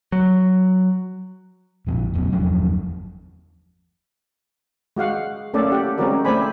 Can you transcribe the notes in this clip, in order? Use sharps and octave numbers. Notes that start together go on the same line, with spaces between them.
F#3
A#1 F2 A#2 F3
E1 F#2 B2
G1 E2 F3 F#3
G#3 F#4 F5 F#5
A3 A#3 C#4 A4 D5
G4 F#5
G#3 C4 C#4 F#4 A#4 D5
A3 C4 C5 D5 G#5 B5